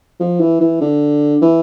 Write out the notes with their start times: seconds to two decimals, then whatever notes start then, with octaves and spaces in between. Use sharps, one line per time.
0.20 F3
0.40 E3
0.61 E3
0.81 D3
1.42 E3